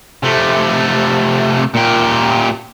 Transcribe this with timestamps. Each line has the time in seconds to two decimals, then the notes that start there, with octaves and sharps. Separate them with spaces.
0.23 C3 A3
1.75 A#2 G4